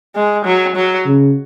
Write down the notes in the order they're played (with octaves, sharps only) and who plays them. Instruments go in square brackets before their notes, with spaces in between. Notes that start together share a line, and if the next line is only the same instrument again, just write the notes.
[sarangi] G#3
F#3
F#3
[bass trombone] C#3